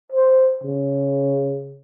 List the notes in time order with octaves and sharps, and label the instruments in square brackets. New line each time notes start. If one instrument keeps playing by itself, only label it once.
[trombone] C5
C#3